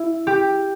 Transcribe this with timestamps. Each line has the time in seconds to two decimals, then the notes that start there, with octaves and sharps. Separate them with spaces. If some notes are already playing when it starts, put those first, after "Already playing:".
Already playing: E4
0.27 G4